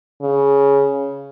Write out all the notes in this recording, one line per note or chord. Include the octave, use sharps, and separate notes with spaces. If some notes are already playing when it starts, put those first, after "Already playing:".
C#3